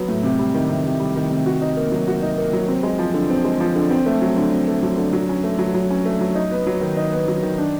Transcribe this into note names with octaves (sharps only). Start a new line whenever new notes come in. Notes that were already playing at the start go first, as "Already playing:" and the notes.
Already playing: F#3 B3
A2
C3
G3
D#3
C3
C3
G3
D#3
C3
F#4
D#4
A#3
F#3
F#4
D#4
A#3
F#3
C4
G#3
F3
D3
C4
G#3
F3
D3
C4
A3
F#3
D3
C4
A3
F#3
D3
F#3
C#4
A3
F#3
F#3
C#4
A3
F#3
D#4
B3
F#3
D#3
D#4
B3
F#3
D#3
D4